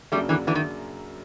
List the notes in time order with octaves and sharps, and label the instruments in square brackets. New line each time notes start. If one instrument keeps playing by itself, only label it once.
[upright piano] F#2 C#3 F#3 A#3 D4 [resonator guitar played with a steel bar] G3 A3
[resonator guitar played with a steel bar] D3 E3
D3 E3
D#3